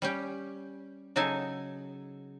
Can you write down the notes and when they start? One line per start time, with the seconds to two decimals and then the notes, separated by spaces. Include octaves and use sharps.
0.02 G3 C#4 G4
1.16 C#3 F#3 D#4 A4 G#5 A5